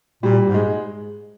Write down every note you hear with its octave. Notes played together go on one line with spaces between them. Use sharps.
A#2 G3
G#2
G#3